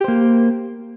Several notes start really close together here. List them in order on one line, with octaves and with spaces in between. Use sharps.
G4 C5 A#3